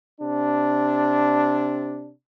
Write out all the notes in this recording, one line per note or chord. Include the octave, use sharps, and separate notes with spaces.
C3 D4